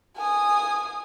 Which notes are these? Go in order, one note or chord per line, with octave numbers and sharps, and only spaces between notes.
G#5 D#6